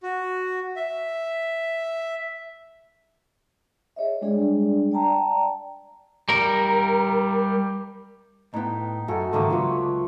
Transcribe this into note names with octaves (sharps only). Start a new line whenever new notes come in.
F#4
E5
G#4 C#5 D#5 E5
G3 G#3 D4 G#4 D5
D5 G5 A5 A#5
G3 A#4
A2 B3 D#4 G5
F#2 F#4 A4 G#5
G#2 D3 D#3 A3 A#3 D6
C#2 F#3 F4 B4 C#5